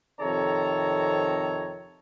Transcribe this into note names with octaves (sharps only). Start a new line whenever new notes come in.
F2 C3 D#3 A4 C#5 A#5